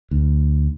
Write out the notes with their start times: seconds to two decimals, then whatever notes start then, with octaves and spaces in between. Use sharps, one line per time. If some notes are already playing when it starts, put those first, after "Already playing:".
0.11 D2